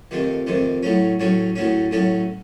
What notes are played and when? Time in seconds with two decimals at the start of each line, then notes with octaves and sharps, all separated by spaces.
0.11 F2 C3 D#3 A3
0.47 F2 C3 D#3 A3
0.83 A2 F#3 A3 C#4
1.20 A2 F#3 A3 C#4
1.56 A2 F#3 A3 C#4
1.91 A2 F#3 A3 C#4